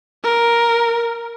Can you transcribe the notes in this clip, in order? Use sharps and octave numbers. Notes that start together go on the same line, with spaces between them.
A#4